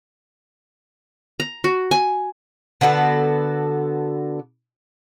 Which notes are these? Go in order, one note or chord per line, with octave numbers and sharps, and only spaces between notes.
A#5
F#4
G#5
D3 B3 F#4 A4